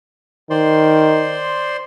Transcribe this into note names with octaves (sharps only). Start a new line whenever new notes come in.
D#3 C5 D5 C6